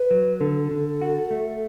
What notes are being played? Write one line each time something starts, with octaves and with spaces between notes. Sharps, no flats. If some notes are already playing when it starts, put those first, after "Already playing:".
Already playing: B4
F#3
D3 A4
D3
F#4
A3